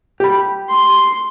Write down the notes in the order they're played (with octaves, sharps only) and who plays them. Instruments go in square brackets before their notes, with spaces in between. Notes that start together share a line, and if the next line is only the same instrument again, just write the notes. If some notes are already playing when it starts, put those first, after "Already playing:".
[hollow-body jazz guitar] G4 B5
[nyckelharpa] C6